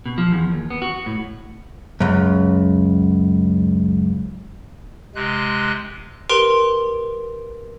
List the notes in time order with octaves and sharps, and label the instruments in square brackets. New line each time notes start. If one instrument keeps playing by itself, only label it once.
[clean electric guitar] B2
F3
E2
D#2
B3
F#4
A2
[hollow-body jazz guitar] C#2 F#2
[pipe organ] C3 G#3 F#6
[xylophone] G4 A#4 B4 C6 D7 G7